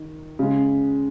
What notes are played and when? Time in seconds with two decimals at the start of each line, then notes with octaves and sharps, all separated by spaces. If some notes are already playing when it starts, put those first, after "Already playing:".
Already playing: D#3
0.39 C#3 G#3